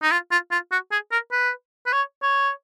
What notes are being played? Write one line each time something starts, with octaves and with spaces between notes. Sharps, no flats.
D#4
F4
F4
F4
F#4
G#4
A#4
B4
B4
C#5
C#5